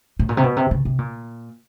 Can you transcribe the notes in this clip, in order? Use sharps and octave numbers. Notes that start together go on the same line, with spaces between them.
A2
A#2
C3
B2
C3
C#3
C3
A#2